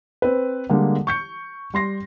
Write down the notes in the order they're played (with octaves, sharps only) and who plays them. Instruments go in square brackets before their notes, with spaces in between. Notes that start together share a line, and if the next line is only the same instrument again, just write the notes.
[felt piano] C4 B4
D3 G3 G#3 A#3
C#6 G6 C#7
G3 C6 A#6 C7